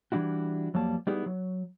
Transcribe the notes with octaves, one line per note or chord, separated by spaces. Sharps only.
E3 G3 D4 E4 F#4
F2 F#3 G3 A#3 A5
G3 B3 D#4 E4 G4 G#4
F#3